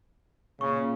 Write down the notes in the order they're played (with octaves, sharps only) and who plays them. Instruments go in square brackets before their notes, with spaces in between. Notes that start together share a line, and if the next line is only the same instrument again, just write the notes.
[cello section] A#2 [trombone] C#3 [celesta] C#6